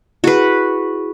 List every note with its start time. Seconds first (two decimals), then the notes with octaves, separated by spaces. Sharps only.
0.24 E4 F#4 G#4 B4